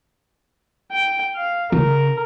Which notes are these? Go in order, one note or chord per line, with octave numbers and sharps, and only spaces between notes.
G5
F5
C#3 A#4